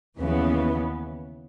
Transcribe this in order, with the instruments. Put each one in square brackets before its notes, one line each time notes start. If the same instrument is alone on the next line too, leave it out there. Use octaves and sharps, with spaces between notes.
[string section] D#2 C#3 E3 B3